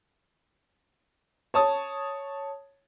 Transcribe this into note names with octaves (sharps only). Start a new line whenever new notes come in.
C#5 A5 D#6